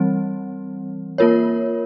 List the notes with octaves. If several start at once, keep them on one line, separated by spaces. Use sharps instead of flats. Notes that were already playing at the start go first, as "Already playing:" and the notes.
Already playing: E3 G3 C4
A#3 F4 A#4 C#5